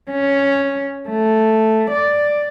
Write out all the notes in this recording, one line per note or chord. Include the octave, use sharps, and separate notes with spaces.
C#4
A3
D5